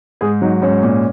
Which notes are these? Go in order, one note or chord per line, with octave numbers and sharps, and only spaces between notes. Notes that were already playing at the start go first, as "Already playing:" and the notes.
G#2 G#4
F#3 D#4
G#2 C#4
A#2